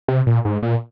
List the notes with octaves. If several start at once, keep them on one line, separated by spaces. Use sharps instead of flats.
C3
A#2
G#2
A#2